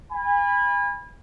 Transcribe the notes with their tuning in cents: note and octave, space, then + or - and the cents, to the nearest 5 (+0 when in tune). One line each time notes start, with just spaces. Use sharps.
G#5 -35 B5 -10